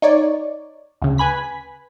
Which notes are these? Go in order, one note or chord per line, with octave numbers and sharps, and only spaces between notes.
D#4 C#5 D5
D2 C#3
B4 G#5 B5 B6